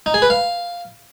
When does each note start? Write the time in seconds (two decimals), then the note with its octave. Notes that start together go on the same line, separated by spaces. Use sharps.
0.06 D#4
0.14 G#4
0.22 B4
0.30 F5